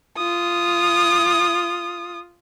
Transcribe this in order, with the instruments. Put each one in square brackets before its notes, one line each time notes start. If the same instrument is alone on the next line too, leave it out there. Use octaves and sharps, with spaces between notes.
[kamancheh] F4 D#6